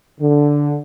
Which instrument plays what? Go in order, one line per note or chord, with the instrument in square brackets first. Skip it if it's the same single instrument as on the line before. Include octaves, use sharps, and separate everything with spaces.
[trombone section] D3